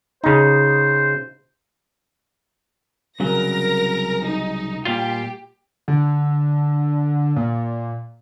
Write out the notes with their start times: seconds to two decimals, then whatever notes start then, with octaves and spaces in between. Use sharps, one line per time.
0.24 C#3 D#4 C5
3.20 C2 C#3 F#3 A#4 A#6
4.23 D#4
4.85 A#2 G3 F4 G4
5.88 D3
7.36 A#2